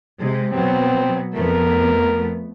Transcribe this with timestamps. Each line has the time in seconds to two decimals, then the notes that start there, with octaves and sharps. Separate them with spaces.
0.19 C3 G#3
0.53 B2 F#3 B3 C4
1.35 F2 A3 B3 A#4